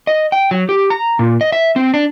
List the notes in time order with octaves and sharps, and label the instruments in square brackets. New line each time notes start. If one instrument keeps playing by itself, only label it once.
[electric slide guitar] D#5
G5
F#3
G4
A#5
A#2
D#5
E5
C4
D4